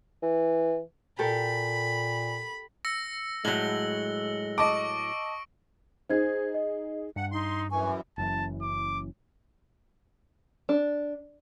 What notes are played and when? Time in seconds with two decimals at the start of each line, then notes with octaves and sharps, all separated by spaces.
0.23 E3
1.19 A#2 G4 A4 A#4 B5
2.85 E6 A#6 C#7
3.45 A2 F#3 G#3 F#7 G7
4.58 D#5 A5 C#6 D6 D7
6.10 D#4 G#4 C5 G#6
6.54 D#5
7.16 G2 F#5
7.32 D#4 C6
7.71 F#2 E3 G#5 C#6
8.18 F#1 F#2 E3 A5
8.62 D6
10.69 D4